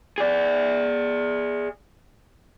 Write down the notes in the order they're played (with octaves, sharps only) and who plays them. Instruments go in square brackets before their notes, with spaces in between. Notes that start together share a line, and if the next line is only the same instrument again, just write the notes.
[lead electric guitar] G#4 D5